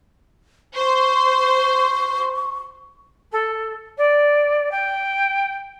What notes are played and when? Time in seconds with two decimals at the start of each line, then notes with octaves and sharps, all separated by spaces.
0.75 C5 C#6
3.32 A4
3.97 D5
4.71 G5